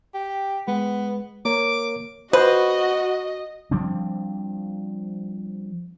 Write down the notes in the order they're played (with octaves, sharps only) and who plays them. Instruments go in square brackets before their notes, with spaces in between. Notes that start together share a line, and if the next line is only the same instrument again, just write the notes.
[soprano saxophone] G4
[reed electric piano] G#3 [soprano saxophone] B3
[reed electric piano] A#3 A#4 C#5 [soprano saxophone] D6
[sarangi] F#4 [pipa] B4 [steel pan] C5 [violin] D#5
[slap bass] F3 G3 C4 D4